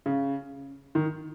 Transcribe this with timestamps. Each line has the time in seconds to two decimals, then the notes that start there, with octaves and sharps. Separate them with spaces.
0.06 C#3
0.95 D#3